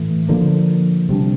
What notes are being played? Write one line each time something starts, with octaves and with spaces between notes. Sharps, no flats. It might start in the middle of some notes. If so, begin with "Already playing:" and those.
Already playing: A2 E3 A3
D3 F3 A#3
C3 G3 D4